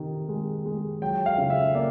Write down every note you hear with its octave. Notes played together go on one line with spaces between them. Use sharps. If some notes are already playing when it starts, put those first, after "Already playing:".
Already playing: C3 D#3
G#3
G#3
F#3 G5
F5
C#3
E5
A#3 D5